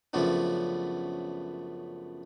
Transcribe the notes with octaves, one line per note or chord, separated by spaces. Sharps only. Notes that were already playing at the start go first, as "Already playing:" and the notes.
F#2 C#3 F3 A3 B3 D4